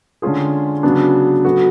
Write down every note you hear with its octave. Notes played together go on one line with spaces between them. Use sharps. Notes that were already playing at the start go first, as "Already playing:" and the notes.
D3 G#3 C#4 F4 G#4
C#3 F#3 B3 D4
F#3 B3 F#4 A4